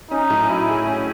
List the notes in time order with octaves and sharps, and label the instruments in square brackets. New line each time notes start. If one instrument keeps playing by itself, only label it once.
[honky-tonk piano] C#4 [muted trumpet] D#4
[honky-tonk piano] A2
[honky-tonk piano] F#3 [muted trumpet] E4
[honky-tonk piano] G#4
C#4